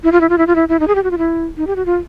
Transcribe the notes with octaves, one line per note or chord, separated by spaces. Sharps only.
E4
F4
E4
F4
E4
F4
E4
E4
D#4
G#4
G4
F#4
F4
E4
D#4
G4
F#4
F4